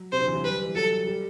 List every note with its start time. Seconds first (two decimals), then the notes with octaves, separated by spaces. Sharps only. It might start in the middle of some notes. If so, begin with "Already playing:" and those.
Already playing: F#3
0.12 C3 C5
0.21 D3
0.28 E3
0.35 F#3
0.43 G3 B4
0.65 E3
0.75 F#3 A4
1.07 G3